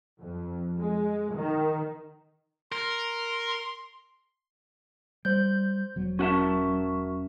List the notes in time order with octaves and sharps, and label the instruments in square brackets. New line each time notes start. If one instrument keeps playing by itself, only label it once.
[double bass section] F2
G#3
D#3
[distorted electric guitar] A#4 [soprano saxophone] C6
[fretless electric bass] G3 [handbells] C5 G6
[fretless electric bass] E1 F#3
[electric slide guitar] C#4 F#5 A5 [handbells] F#4 A#4 E5